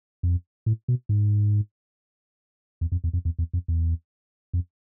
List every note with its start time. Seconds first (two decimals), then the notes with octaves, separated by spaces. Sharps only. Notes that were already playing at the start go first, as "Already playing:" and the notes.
0.23 F2
0.66 A2
0.88 B2
1.09 G#2
2.81 E2
2.92 F2
3.04 E2
3.13 F2
3.25 E2
3.39 E2
3.53 F2
3.68 E2
4.53 F2